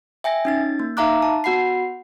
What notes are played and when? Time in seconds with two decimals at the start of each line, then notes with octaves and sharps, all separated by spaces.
0.24 E5 G5 G#5 A#6
0.45 C#4 D#4 A6
0.80 A#3
0.97 D#4 E5 F5 A#5 D6 F#6
1.22 A5
1.44 B3 F#4 F#5 B5 C7